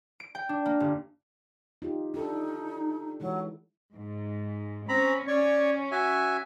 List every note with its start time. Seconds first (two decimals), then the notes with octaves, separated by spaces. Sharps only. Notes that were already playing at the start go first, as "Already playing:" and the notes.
0.20 D7
0.35 G5
0.49 D4
0.66 A#3
0.80 G1
1.82 D#4 F4 G4
2.14 D4 D#4 G4 A4
3.20 E3 F#3 G#3 E4
3.93 G#2
4.89 C4 C#4 A#5 B5
5.27 C#4 C#5 D5 C#6
5.91 F#4 E5 G#5